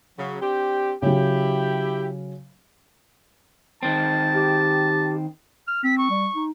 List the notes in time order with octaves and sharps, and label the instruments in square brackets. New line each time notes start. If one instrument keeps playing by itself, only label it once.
[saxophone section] C#3 F#3
C4 D4 G4
[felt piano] C#3 F#3 [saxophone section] E4 G4
[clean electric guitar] D#3 C4 [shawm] A5
[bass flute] G4
[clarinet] F6
[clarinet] C4 [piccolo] B6
[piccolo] C#6
[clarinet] G3
D#4